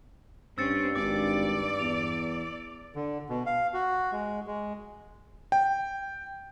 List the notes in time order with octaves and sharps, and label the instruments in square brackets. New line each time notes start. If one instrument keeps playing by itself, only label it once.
[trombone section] G2 [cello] C4 C#4 [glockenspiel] E6 A6 C#7
[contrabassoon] G#1 [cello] D5 [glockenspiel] D6 A6
[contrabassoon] E2 [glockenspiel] F7
[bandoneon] D3
B2
F5
F#4
G#3
G#3
[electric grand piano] G5